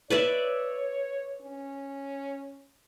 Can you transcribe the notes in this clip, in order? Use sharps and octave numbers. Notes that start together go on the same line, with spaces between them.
B4 C#5 D5 E5
C#4